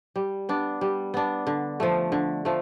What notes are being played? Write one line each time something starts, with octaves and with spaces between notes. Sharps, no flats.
G3
B3 D4
G3
B3 D4
D3
F3 A3
D3
F3 A3